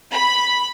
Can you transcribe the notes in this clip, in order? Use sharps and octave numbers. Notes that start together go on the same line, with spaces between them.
B5